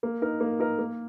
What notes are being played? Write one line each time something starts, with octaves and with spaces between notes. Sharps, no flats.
A#3
D#4 A#4
A#3
D#4 A#4
A#3